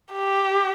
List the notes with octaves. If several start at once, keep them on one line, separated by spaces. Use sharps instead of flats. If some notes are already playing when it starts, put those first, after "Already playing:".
G4